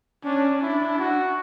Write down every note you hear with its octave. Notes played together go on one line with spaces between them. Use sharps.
C#4 D4
D4 E4
F#4